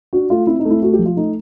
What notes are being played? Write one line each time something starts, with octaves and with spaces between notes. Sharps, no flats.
D4 F#4
A3 F4
C4 E4
D#4
A3 E4
A3 F#4
G4
F3
F4
A3 D#4